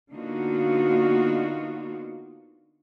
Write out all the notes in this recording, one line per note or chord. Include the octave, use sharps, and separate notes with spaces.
D3 A#3 B3 D#4 F4 F#4